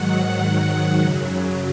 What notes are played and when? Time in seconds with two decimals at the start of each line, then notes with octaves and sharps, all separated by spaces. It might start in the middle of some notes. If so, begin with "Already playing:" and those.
Already playing: G#2 D#3 F#3 F#5
0.99 F#2 C#3 F#3